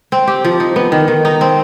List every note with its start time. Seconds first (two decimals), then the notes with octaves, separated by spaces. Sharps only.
0.12 C4
0.27 G4
0.45 F3
0.60 D#4
0.76 B3
0.92 D#3
1.08 D#3
1.25 D#4
1.41 C4